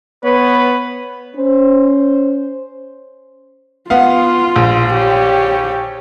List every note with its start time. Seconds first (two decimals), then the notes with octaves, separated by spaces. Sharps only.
0.24 B3 B4 C#5
1.36 C#4 C5
3.90 B3 F4 F5
4.56 A#1
4.94 G4 C#5